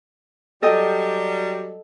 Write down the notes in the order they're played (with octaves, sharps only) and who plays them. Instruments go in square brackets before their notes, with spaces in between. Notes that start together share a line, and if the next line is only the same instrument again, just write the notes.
[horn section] F#3 G3 [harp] A4 D#5 G5